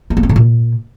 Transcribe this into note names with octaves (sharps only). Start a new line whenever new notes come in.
A3
A#3
C4
D3
A#2